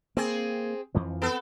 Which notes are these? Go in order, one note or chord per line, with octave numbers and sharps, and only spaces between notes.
A#3 C4 G#4
F2 E3 F3
B3 A4